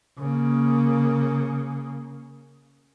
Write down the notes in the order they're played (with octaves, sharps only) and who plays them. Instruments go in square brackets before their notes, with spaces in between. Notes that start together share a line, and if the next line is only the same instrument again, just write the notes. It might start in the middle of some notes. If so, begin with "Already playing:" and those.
[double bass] C#3 A#3